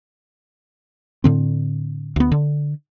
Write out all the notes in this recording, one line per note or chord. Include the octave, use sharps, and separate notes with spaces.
A2 D3 C4
D2 B3
D3